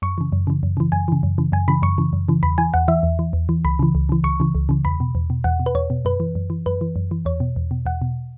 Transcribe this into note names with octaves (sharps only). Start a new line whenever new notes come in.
F#2 C#6
C#3 E3
F#2
C#3 E3
F#2
C#3 E3
F#2 G#5
C#3 E3
F#2
C#3 E3
F#2 G#5
C#3 E3 B5
F#2 C#6
C#3 E3
F#2
C#3 E3
E2 B5
E3 G#5
E2 F#5
E3 E5
E2
E3
E2
E3
C#2 B5
C#3 E3
C#2
C#3 E3
C#2 C#6
C#3 E3
C#2
C#3 E3
E2 B5
B2
E2
B2
E2 F#5
B2
B4
E2 C#5
B2
F#2 B4
E3
F#2
E3
F#2 B4
E3
F#2
E3
E2 C#5
B2
E2
B2
E2 F#5
B2